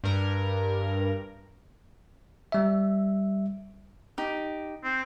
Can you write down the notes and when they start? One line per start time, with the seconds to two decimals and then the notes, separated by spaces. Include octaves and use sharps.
0.04 G2 A#4
2.52 G3 E5
4.18 D#4 G4
4.84 C4